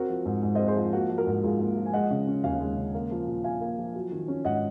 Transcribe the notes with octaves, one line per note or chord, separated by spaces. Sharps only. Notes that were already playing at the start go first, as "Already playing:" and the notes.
Already playing: C4 F#4 A#4
F3
G#2
G#2
C4 C5 D#5
G#4 C5
F3
A#3 F#4
F3
F#4 A#4
G#2
G#2 F4 G#4
A#3
F3
G#5
G#3 D#5 F#5
C#3
C#4
D#2 F5 G#5
G#3
C#3
A#3
F3
A#2
A#2 F5 G#5
A#3
F3
F#3
D#3
C#4
G#2 D#5 F#5